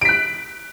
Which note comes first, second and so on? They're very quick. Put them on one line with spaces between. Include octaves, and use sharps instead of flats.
D7 B6 F#6